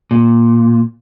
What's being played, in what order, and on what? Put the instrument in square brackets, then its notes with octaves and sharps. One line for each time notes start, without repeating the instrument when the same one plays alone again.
[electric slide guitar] A#2